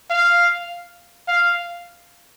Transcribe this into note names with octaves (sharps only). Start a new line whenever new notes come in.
F5
F5